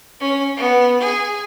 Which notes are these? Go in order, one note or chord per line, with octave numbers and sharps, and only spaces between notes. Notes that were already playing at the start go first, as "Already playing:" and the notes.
C#4
B3
G#4